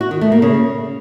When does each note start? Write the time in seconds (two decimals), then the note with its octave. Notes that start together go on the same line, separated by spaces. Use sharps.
0.01 F#4
0.11 D#3
0.21 A3
0.32 A#3
0.42 C#3